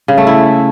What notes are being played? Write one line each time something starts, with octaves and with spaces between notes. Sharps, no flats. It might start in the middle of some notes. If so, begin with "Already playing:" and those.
C#3
A3
E4